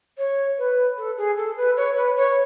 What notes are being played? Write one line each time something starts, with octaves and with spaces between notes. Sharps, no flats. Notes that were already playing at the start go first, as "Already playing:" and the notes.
C#5
B4
A4
G#4
A4
B4
C#5
B4
C#5